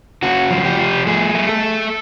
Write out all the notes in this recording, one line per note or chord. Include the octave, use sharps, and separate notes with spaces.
C#3 F#4
F3
G4
F3
A3 G#4
A3
A4
A3